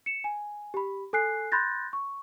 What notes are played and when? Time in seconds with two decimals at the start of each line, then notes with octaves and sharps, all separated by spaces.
0.06 C#7 E7
0.24 G#5
0.74 G4 B5
1.13 A4 G#5 F#6 C7
1.52 B5 C6 F#6 G6 A6 A#6
1.93 C#6